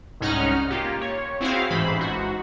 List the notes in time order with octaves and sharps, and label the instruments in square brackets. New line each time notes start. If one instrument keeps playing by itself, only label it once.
[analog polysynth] C2 G#2 C#4 D#4 F#5 F6
A#3 F4 G4
C#5
C4 E4 F#4 G#4 C5 F5
A1 G#2 E3 C5 B5
G#2 F#4